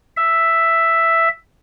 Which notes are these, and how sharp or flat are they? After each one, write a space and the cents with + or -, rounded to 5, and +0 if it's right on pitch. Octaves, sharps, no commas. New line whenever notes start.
E5 +5